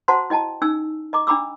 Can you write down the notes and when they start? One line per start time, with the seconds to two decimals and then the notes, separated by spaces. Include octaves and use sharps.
0.08 F#4 C5 F#5 A5 A#5 C6
0.30 E4 D#5 G5 A5 A#5
0.62 C#4 D#4 G#5 E6
1.13 D#5 A#5 D6
1.27 D4 G5 A#5 B5 D6 E6